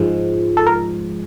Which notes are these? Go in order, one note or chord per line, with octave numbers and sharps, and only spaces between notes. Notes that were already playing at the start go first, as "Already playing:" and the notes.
Already playing: G#2 F3 G#3
A4
A#4